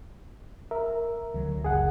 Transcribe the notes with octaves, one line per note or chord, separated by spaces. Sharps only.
A#4 E5
D2 F#3
F#1 C#2 G#4 F#5